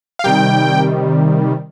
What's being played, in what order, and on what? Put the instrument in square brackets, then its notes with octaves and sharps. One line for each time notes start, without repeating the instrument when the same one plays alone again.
[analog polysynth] F5
C3 D#3 G3 G5